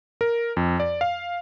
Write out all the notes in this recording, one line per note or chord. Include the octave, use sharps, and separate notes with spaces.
A#4
F2
D5
F5